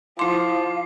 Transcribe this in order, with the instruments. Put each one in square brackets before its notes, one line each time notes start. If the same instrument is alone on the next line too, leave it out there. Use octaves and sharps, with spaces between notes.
[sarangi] F3 [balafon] E4 C6 [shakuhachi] F5 [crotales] D6